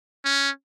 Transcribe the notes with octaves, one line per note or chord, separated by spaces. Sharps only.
C#4